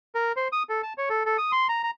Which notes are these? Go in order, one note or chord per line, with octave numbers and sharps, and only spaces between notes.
A#4
C5
D#6
A4
A5
C#5
A4
A4
D#6
C6
A#5
A#5